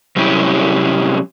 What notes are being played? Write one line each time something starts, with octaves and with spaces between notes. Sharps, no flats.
C3 F#3 G3 C#4 E4 G4